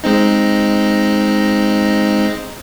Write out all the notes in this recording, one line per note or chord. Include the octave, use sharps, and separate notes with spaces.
G#3 C4 D#4